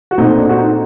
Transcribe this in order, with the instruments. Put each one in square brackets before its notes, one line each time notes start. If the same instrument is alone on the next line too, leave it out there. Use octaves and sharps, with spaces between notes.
[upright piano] F#4
A#2 A3 C4 D#4
D4
F#4
D#4